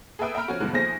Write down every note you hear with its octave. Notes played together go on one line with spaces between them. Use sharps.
G#4 A4 B4 E5 G5 D#6
E5 G5 A#5 B5 F6 D7
F3 C#4 F#4
D2 G2 B2 E3 G#3
D#2 F3 A3 G#4 C5 A#6